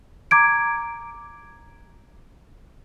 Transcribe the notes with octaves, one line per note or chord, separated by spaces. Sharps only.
A#5 D6 G#6 D7